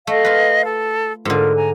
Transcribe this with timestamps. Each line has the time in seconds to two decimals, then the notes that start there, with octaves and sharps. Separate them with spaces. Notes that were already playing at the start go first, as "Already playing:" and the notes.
0.07 A3 D#5 F5
0.25 F4 B4
0.64 A4
1.25 G#2 D3 F4 A#4
1.55 G#5 A#5